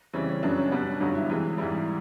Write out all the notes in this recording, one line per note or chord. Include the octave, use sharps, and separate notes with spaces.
C#3 E3 G3 C4 C#4
C#4
F#2 C#3 F#3 B3 D4
C#4
B2 G3 B3 D4
G2 D3 F#3 D#4
E4
C3 E3 G#3
G#2 E3 G3 E4